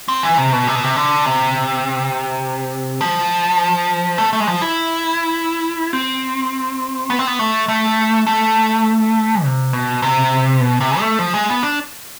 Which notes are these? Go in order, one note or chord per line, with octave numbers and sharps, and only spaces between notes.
C4
E3
C3
B2
C3
B2
C3
D3
C3
F3
A3
A3
G#3
F3
E4
C4
B3
C4
B3
A3
A3
A3
C3
B2
C3
B2
C3
A3
F3
G#3
B3
D4